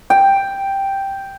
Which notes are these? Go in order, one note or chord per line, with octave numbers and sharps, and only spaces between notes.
G5